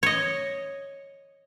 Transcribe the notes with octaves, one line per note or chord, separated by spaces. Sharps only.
C#5 D#5